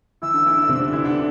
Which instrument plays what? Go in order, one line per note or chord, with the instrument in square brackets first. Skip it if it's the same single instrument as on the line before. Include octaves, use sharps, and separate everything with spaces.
[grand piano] E3 E4 [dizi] E6
[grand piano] D3 D4
E3 E4
D3 D4
C3 C4
D3 D4
E3 E4
D3 D4